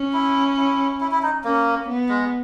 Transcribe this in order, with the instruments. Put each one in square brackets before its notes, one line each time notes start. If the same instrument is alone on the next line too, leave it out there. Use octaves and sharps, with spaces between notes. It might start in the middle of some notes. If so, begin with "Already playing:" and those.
Already playing: [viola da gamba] C#4
[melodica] E4
E4
E4
E4
D#4
[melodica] A#3 [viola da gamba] C#4
[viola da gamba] B3
[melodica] G#3